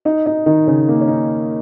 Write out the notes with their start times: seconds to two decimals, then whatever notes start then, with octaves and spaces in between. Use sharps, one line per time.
0.05 D#4 D#5
0.26 D#4 D#5
0.46 D#3 D#4
0.67 C#3 C#4
0.88 A#3
1.01 C#4
1.08 D#4